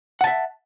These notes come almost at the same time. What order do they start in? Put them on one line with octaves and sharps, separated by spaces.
F#5 A5 E5